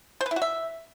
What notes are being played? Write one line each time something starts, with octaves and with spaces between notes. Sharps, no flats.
C5
B4
E4
F#4
E5